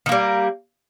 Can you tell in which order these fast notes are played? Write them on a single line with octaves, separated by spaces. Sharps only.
D#3 A#3 G3